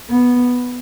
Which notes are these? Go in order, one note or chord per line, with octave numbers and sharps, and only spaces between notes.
B3